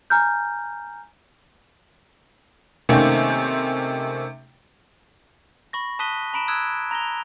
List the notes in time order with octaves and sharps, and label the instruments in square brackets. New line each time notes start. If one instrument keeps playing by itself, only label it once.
[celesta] G#5 A#5 F6 G6
[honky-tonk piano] C3 D#3 A3 A#3 C4 C#4
[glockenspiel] B5 C#6 A#6
A5 D#6 F#6 B6 D#7 G7
A#5 B5 D7 E7
D#6 E6 F#6 G#6 D7 E7
A#5 A#6 F7 G7